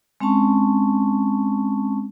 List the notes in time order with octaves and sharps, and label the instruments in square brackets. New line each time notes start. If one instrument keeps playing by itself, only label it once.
[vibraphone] G#3 C4 C#4 A5 C#6